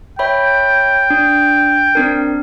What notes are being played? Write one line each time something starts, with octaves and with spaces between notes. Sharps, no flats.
C#5 E5 G5 B5
D4
C4 D4 A#4